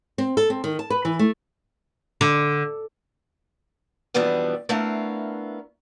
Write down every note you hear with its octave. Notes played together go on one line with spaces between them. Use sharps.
C4
A4
C4
D#3
A5
B4
E3
A3
D3
F2 B2 E3 G3 B3 D4
A3 B3 D4 E4 A#4 F5